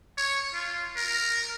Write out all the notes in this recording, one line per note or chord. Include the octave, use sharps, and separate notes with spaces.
C#5
F4
A#4